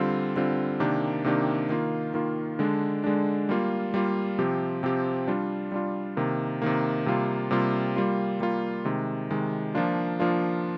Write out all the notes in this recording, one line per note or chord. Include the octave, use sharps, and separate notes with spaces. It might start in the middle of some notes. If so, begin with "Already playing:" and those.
Already playing: D3 G3 C4 F4
D3 G3 C4 F4
C3 D#3 A#3 D4 G4
C3 D#3 A#3 D4 G4
D#3 A#3 F4
D#3 A#3 F4
D3 G#3 D4
D3 G#3 D4
G3 A#3 F4
G3 A#3 F4
C3 F3 C4 G4
C3 F3 C4 G4
G3 D4 F4
G3 D4 F4
C3 D#3 A#3
C3 D#3 A#3
C3 G3 A#3 F4
C3 G3 A#3 F4
G3 A#3 F4
G3 A#3 F4
C3 D#3 G#3
C3 D#3 G#3
F3 A#3 D4 F4
F3 A#3 D4 F4